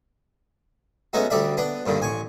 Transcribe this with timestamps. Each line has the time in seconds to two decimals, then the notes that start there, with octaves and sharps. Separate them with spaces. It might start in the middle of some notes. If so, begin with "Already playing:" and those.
1.13 G#3 A3 B3 C#4 D#4 F#4
1.30 D2 G3 A4 D5 E5
1.57 B3 D4 B4
1.86 G2 A#2 D3 D#3
2.00 A1 G#5 C#6